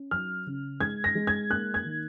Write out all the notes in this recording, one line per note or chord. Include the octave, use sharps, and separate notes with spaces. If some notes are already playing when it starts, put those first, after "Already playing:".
Already playing: C#4
F#3 F6
C#3
G#3 G#6
A#6
G#3
G#6
A#3 F#6
G#6
D#3